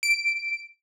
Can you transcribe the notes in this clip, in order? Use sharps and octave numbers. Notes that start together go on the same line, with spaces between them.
D7